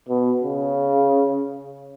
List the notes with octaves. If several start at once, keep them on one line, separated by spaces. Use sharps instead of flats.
B2
C#3